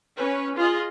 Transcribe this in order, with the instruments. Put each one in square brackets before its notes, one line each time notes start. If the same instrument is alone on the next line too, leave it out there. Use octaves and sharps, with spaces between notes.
[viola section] C#4 B4
F4 G#4 D#5